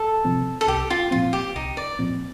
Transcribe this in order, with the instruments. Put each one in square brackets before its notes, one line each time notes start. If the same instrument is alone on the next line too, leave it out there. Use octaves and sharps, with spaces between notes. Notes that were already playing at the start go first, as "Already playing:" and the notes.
Already playing: [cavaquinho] A4
[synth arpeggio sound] C3 F3 C4
[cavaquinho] A4
[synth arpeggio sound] C2 [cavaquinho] G4
[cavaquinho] F4
[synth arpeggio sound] A#2 F3 C4 [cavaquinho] F4
[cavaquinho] G4
[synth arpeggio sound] C2 [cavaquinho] D#4
[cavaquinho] D5
[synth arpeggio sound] A#2 F3 C4